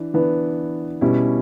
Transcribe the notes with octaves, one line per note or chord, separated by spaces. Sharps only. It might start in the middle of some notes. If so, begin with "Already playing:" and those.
Already playing: E3 D4
E3 B3 D4
B2 G3 C#4 E4